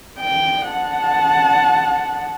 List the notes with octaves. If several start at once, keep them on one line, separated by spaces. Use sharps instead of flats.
G5
F#5 A5